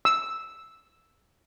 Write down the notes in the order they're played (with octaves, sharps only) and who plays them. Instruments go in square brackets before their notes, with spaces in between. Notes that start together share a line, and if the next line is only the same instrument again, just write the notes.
[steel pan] E6